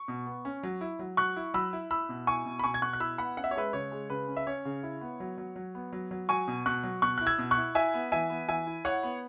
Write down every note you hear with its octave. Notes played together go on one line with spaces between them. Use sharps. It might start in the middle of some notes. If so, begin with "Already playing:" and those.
Already playing: C#6
B2
B3
C#4
F#3
E4
F#3
F#3 C#6 F#6
E4
F#3 B5 E6
E4
E4 B5 E6
B2
E4 G#5 C#6
B2
B5
B2 G#5 C#6
G#6
B2 C#6 F#6
F#6
E4 B5 E6
B3 F#5 B5
C#4 F#5
E5
C#5
G#3 B4 E5
C#3 C#5
G#3
C#3 B4
C#4
E5
C#4 C#5
C#3
E4
B3
F#3
F#3
F#3
B3
F#3
F#3
F#3 G#5 C#6
B2
B2 C#6 F#6
F#3
B2 C#6 F#6
E4 F#6
E6 G#6
B2
C#6 F#6
E4
E4 E5 G#5
B3
E3 E5 G#5
B3
E3 E5 G#5
E4
E4 C#5 F#5
B3